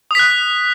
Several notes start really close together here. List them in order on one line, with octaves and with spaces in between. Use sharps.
D#6 B6 F#6